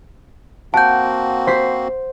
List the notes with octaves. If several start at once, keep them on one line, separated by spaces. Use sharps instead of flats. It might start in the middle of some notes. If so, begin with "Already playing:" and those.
A#3 C4 F#4 F#5 A5 G6
C5 B6 C7